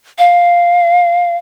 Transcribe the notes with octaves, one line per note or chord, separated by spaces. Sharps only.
F5